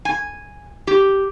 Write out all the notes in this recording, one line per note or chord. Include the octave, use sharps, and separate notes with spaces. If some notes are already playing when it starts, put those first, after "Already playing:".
G#5
G4